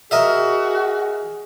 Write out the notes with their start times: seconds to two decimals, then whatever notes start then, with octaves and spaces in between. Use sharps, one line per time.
0.11 F#4 G#4 A#4 D#5 E5